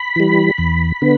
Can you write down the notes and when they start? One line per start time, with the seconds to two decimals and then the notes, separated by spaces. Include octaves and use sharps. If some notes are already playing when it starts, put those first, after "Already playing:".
Already playing: B5
0.16 E3 G3
0.58 E2
1.02 D3 B3